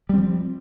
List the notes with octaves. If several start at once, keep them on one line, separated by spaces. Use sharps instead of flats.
F3 G3 C4